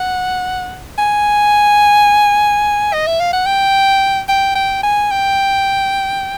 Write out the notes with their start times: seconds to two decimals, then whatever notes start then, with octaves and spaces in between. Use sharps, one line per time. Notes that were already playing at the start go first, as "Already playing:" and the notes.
Already playing: F#5
0.98 G#5
2.93 D#5
3.07 E5
3.20 F5
3.33 F#5
3.46 G5
4.28 G5
4.55 G5
4.83 G#5
5.11 G5